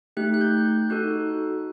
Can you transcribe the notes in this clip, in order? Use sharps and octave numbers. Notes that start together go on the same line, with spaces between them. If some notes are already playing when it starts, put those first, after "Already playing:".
A3 D#4 G4 F#6
F#6
G6
G6
D#4 F#4 A4 F#6